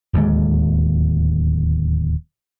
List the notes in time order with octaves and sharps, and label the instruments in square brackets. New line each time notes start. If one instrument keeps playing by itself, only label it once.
[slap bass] D1 D#2 D3 G#3